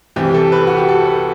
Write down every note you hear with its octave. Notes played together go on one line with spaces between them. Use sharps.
C2 C3 E3 G4
A4
B4
F#4
G4
A4
B4